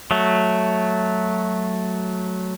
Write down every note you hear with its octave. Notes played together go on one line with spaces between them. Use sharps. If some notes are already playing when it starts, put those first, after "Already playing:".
F#3 A3